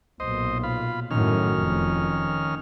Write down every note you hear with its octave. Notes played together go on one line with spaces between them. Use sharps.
B1 A#2 C5 D#5
F4 B5
F#2 A2 D#3 C#4 F6
F1 F2